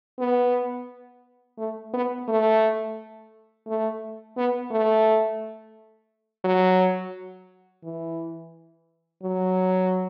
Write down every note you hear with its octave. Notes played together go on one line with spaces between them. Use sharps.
B3
A3
B3
A3
A3
B3
A3
F#3
E3
F#3